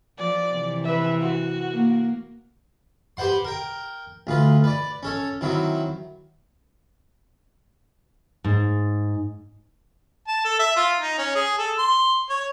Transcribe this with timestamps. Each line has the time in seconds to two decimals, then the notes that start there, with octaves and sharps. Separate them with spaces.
0.18 F3 D5
0.53 C3 E3
0.84 B4 E5
1.21 F#4
1.71 A#3
3.17 G4 B4 C5 F#5 C6
3.45 A#4 G5
4.27 D2 F4 B4
4.64 B4 D5
5.03 C#4 A4 C#5
5.41 D#3 F#3 C4 E4
8.44 G#2
10.28 A5
10.45 A4
10.59 E5
10.76 F4
11.00 D#4
11.18 C#4
11.35 G#4
11.58 A4
11.78 C6
12.29 C#5